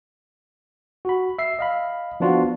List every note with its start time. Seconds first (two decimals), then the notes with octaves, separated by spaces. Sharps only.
1.05 F#4 B5
1.39 E5 C7
1.59 D#5 F5 B5
2.20 F3 B3 D4 F4 F#4